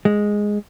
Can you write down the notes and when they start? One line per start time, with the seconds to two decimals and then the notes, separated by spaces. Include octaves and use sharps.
0.05 G#3